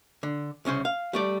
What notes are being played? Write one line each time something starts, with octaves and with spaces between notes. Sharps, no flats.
D3
C2 C#3 C#4 C5
F5
G3 A3 D5